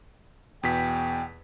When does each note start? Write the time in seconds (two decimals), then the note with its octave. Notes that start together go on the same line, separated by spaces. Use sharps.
0.63 E2 B2 G5 B6